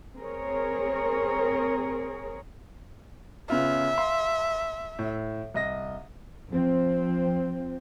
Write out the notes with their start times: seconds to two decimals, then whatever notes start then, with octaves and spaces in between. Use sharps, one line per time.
0.17 C4 G#4 A#4 C#5
3.50 C#3 B3 F4 E5
3.98 F5 C6
4.99 A2
5.54 C2 D#5 A#6
6.51 F3 C4